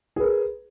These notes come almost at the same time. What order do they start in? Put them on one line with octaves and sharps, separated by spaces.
G#4 B4 A#4